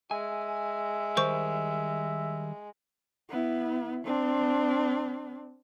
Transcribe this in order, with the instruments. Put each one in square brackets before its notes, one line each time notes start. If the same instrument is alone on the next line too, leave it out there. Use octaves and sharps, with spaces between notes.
[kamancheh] G#3 [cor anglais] E5 [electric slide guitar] G#5
[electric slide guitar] D#3 G3 A#4 [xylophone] C5 C#6
[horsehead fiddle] B3 E4
C4 D4